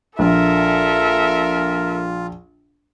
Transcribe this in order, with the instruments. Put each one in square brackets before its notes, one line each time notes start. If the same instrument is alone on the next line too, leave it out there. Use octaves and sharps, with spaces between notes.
[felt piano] A#1 [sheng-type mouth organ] F4 [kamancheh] A4 E5 [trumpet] A#4